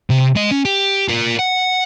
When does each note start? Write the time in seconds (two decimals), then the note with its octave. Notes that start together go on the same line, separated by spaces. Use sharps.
0.10 C3
0.35 G#3 D#5
0.51 C#4
0.65 G4
1.08 F4 A#4
1.39 F#5